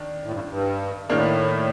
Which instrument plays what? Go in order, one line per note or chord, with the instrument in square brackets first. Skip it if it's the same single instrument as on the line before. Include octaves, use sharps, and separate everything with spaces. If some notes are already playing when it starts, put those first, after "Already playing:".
Already playing: [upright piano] D#3 D4
[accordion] A2
G2
G2
[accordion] A2 [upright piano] D#3 A#3 D4